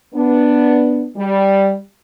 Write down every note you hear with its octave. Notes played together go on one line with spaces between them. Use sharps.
B3 D4
G3